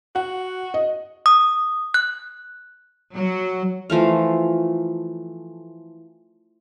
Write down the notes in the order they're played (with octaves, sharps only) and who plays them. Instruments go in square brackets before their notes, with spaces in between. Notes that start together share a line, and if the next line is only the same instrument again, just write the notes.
[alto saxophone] F#4 [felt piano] F#5
[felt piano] D#5
[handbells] D#6
F#6
[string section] F#3
[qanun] E3 F3 A3 F5